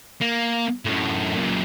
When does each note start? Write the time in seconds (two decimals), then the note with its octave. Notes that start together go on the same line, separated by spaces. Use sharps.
0.21 A#3
0.85 F#2 A2
1.36 F#2 A#2